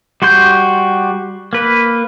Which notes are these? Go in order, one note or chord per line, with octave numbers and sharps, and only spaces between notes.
G3 F#4 C6 G6
A#3 B4